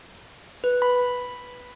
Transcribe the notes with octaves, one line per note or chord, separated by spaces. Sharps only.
B4
B5